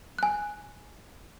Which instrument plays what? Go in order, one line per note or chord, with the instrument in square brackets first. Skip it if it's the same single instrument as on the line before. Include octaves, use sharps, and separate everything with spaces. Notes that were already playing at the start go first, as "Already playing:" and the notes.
[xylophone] G#5 F#6